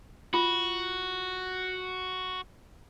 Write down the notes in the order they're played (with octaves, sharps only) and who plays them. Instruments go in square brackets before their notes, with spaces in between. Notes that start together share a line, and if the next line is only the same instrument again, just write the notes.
[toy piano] F4 [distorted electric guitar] F#4